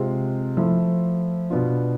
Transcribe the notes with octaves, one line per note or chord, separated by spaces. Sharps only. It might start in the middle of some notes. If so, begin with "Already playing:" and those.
Already playing: C3 G#3 C4 F4
F3 A3 E4
B2 B3 D4 F4